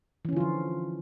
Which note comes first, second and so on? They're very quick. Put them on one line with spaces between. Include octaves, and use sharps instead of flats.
E3 C#4 D3 F4 F3